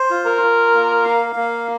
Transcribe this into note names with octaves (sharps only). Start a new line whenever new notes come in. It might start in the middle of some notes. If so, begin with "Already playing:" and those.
Already playing: C5
F4
A#4
F4
A#3
F5
A#3